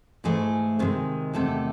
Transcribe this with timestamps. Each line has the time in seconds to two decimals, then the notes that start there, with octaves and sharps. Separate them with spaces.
0.24 G#2 E3 A3 G#4
0.79 C3 D#3 G#3
1.33 E2 C3 D#3 A3 A4